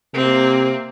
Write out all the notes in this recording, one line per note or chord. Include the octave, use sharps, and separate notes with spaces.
C3 A#3 C4